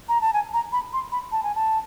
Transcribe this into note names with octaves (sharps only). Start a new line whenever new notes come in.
A#5
A5
G#5
A#5
B5
C6
B5
A5
G#5
A5